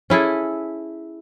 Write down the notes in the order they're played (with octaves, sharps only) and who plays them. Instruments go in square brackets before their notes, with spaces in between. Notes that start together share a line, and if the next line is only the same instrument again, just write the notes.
[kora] C#4 E4 G#4 A4